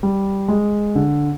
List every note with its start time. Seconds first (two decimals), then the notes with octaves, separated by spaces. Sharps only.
0.03 G3
0.48 G#3
0.95 D3